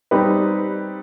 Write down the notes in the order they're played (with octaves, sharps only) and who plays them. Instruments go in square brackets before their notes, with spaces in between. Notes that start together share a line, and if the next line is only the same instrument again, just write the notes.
[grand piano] G3 C4 D#4 G4 B4